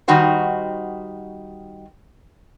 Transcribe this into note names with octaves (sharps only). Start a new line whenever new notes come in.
D#3 G3 D#4 F#4 C5